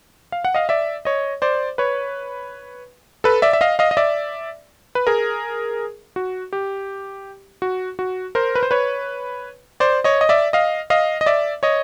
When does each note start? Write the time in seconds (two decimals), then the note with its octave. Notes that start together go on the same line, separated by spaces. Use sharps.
0.32 F5
0.45 F#5
0.54 D#5 F5
0.69 D5 E5
1.05 C#5 D#5
1.42 C5 D5
1.78 B4 C#5
3.24 A4 B4
3.42 D5 E5
3.53 E5
3.61 D#5 F5
3.79 D#5 F5
3.91 D#5
3.97 D5 E5
4.95 B4
5.07 G#4 A#4
6.16 F#4
6.53 G4
7.62 F#4
7.99 F#4
8.35 A#4 C5
8.55 B4
8.63 C5
8.71 B4 C#5
9.80 C5 D5
10.04 C#5 D#5
10.21 D#5
10.29 D5 E5
10.53 D#5 F5
10.90 D#5 F5
11.21 D#5
11.26 D5 E5
11.63 C#5 D#5